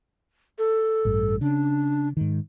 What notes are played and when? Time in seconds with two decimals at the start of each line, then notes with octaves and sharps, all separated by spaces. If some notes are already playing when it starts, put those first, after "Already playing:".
0.59 A4
1.05 A1 G2
1.41 C#3 D4
2.17 G#2 D#3